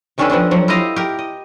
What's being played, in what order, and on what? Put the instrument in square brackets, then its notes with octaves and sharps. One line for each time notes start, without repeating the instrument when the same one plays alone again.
[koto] C3 D#3 C#4 D4 A4 B4
F3 B3 C4 D4
F3 F#3
E4 F4 G4 D#5 F5
G4 A#4
D#5